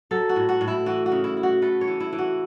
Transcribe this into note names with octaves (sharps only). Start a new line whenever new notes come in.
F#3 A4
F#4
A2
F#4
A2
E4
E3 F#4
F#4
C#3
E4
E4
F#4
A3 B4
C#5
E3
E4
E3
F#4